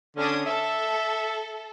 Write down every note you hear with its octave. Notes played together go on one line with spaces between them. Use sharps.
D3 C#4 D4 D#6
A4 E5